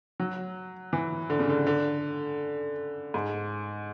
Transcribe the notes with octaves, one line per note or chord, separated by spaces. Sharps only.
F#3
E3
D3
C#3
D3
D3
G#2